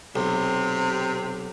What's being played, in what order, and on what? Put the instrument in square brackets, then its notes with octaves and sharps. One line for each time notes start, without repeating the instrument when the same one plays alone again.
[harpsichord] B1 [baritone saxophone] C3